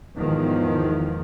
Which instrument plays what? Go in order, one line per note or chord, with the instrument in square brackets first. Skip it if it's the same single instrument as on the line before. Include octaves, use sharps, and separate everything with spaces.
[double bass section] E2 G#2 D#3 F3